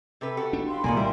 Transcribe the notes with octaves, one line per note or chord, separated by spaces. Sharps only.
C3 A4 B4
F#4 G4 A4
D4
F5 B5 C6
C2 A#2 D#3 A#3 D5 G#5
G3 E4 A#4